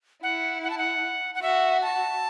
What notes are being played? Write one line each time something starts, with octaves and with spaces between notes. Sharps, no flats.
E4 F#5
F#5
A5
F#5
F#5
F#4 E5
A5